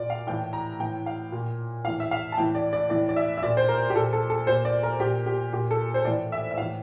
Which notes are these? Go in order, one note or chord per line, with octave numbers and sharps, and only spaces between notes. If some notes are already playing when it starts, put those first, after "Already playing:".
Already playing: A#2 D5
F5
A2 E3 G5
A#5
A2 E3 G5
F5
A#2
A2 E3 F5
E5
F5
A5
A2 E3 G5
D5
D5
A2 E3 D5
D5
E5
E5
A#2 D5
C5
A#4
G4
A#2 A4
A4
A4
A#2 C5
D5
A#4
A#2 G4
G4
A#2 G4
A4
C5
A2 E3 D5
E5
E5
A2 E3 F5